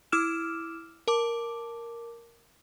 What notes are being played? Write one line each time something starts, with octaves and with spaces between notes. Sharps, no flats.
E4 D6 E6 F6 E7
A#4 A5 D6